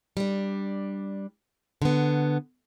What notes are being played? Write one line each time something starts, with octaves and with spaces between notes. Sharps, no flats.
G3 D4
D3 B3